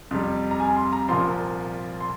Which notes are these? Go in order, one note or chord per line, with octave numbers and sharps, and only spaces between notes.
F2 C3 G3
A#5
G#5
C6
A#5
C2 A#2 F3 C6
C6